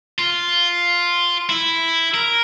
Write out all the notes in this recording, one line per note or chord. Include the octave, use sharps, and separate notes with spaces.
F4
E4
A#4